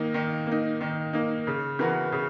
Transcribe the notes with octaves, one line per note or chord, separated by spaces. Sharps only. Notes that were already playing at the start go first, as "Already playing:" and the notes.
Already playing: D#3 A#3 D#4
D#3
A#3 D#4
D#3
A#3 D#4
C#3
E3 B3 F#4 A#4
C#3